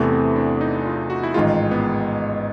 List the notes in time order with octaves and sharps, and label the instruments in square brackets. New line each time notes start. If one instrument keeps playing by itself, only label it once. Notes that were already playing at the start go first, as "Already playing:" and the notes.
Already playing: [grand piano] E2 C3 E3 A3 [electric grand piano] B3
[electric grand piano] C4
D4
D#4
F4
F#4
E4
[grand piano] A1 G#2 D#3 G#3 [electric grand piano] F4
[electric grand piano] B3